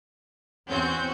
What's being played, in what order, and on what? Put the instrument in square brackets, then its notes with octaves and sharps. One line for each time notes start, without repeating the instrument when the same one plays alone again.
[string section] E2 C4 G6 [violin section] C#4 F#4